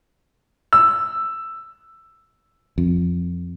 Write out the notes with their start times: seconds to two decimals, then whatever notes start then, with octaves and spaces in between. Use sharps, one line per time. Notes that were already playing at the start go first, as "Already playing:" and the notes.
0.73 E6
2.78 F2